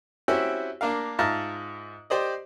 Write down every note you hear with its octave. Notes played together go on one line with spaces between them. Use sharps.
C4 C#4 E4 F#4 G4 E5
A#3 D4 A#4 F5
G#2 F4 E5 A5 A#5 F6
G4 C5 D5 D#5